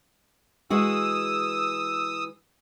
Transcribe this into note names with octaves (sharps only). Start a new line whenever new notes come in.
E3 G#3 F#4 D#6 E6